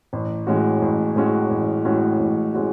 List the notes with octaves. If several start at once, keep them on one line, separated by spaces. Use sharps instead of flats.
A1
A2 G#3 C#4 F#4
A1
A2 G#3 C#4 F#4
A1
A2 G#3 C#4 F#4
A1
A2 G#3 C#4 F#4